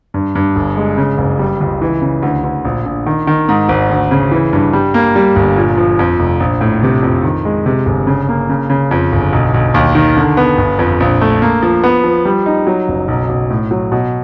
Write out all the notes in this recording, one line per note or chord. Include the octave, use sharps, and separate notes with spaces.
G2
G2
G1
G#3
C#3
F#1
G3
C#2
E3
C#3
D2
D2
A#1
A#1
D#3
D#3
G#2
G#1
D2
C#3
E3
G2
G3
A#3
G3
G1
A#2
F3
F2
F1
A#1
A2
C3
F2
D#3
G#3
C3
G1
C#3
A#3
C#3
C#3
F2
G1
B1
B1
D#2
D#3
D3
B3
G1
F2
A#1
A3
A#3
F3
B3
F3
G3
D#4
F#3
F#1
B1
B1
A2
F#3
B2